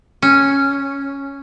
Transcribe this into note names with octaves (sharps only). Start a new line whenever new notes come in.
C#4